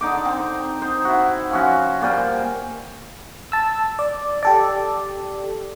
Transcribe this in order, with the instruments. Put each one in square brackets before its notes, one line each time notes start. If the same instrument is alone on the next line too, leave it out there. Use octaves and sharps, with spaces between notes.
[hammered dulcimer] D3 D#4 D6
C4
D#4 C5
E4 F#4
F3 C#4 F#4
A#2 G3 C5 G#5
[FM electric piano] A5 E6
D5
G4 A4 D5